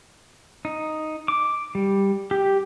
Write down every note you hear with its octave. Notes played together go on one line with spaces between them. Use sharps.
D#4
D6
G3
G4